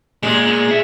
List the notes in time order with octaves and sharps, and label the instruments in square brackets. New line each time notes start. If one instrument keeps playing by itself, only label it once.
[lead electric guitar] A#2 [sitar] G#3
[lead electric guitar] A#2
G#4 E5